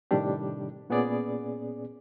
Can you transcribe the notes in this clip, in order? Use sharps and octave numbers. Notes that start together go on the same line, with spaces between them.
A2 C3 D#3 G3 D4 G4
A#2 B3 C#4 G#4 D5